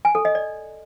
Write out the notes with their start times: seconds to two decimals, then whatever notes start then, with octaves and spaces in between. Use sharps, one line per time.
0.05 G#5
0.15 A4
0.25 D#5
0.35 D5